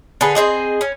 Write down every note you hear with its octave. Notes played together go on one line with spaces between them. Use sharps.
D3 G#4 B4
C4 D#4 G#4 D#5
C#4